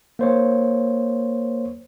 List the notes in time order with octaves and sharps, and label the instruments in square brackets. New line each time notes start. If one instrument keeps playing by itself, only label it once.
[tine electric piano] A#3 C5 C#5